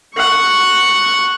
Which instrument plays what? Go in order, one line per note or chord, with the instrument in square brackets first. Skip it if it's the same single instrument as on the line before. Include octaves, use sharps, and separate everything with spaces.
[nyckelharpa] F#5 C#6